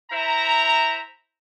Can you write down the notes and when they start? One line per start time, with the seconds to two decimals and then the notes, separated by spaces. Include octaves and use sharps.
0.12 E4 C5 E5 A#5